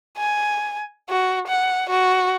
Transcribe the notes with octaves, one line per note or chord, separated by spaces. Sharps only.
G#5
F#4
F#5
F#4